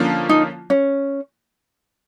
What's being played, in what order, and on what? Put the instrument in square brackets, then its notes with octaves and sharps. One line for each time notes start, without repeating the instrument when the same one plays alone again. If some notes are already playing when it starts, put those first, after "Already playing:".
Already playing: [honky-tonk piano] D3 F3 A#3 C#4 F4
[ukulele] D#4
C#4